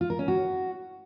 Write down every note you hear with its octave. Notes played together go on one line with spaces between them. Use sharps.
F4
A#4
C#4
F#4